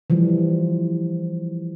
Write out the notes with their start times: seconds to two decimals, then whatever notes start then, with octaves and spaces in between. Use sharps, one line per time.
0.10 E3 F3 G3